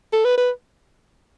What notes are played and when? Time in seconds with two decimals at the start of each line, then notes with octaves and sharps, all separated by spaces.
0.13 A4
0.24 B4
0.38 B4